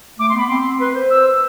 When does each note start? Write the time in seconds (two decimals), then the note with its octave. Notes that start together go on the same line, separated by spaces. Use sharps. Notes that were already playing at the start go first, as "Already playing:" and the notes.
0.19 A3 D6
0.29 C6
0.34 B3 B5
0.47 C4 C6
0.79 B4 C6
0.95 C5
1.10 E6